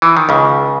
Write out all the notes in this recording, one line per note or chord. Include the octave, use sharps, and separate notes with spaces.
E3
D#3
C#2 C#3